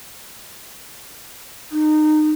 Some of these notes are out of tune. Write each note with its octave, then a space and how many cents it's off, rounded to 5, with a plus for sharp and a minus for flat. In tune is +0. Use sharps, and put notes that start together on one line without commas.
D#4 -25